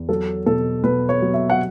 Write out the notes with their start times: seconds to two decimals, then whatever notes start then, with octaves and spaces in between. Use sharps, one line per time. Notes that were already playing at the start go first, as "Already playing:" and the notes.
Already playing: E2
0.09 F#3 A4
0.46 B2 A4
0.83 B2 B4
1.09 C#5
1.22 F#3
1.34 E5
1.50 F#5